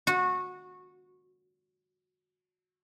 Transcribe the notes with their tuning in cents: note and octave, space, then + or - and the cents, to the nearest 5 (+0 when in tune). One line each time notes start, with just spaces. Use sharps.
F#4 -20